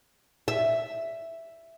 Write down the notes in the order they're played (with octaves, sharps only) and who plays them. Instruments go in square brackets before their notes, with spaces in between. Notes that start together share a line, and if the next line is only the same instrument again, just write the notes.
[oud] E5